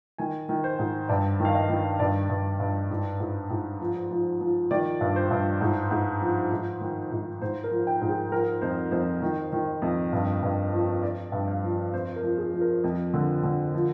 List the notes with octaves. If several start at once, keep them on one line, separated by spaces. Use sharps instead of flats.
D#3 G#5
D#3
C5
G#2
G2 D5
D#3
F5
D#5
D#3
G2 D5
G2
G2
G#2
G#2
G#2
F3
F3
F3
D#3 D5
G2
C5
G2
G#2
G#2
F3
G#2
D#3
G#2
G#2 C5
A#4
F3
G5
G#2
G#4
F3 A#4
F2 C5
F2 C5
D#3
D#3
F2
G2
G2
F3
F3 D5
G2
F5
F3
F2 C5
A#4
F3
G#4
F3
A#4
F2
D3
D3
F3